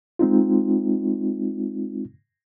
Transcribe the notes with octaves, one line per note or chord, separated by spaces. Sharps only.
G#3 C4 D#4 F4